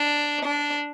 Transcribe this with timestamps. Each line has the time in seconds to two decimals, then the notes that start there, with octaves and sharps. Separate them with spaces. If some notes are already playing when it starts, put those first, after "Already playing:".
Already playing: D4
0.45 D4